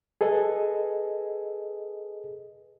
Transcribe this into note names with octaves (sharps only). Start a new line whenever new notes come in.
G#4 A4 B4 D#5